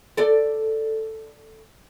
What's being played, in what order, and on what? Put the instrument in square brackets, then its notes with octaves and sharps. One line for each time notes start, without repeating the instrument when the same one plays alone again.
[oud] A4 D5